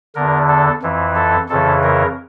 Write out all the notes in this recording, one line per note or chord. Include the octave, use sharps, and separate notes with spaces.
E2 D3 A#4
A4
F2 E3
A4
F2 C#3 E3 A4
A#4